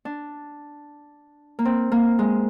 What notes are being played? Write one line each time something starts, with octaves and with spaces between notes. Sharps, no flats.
D4
A#3
C4
A#3
G#3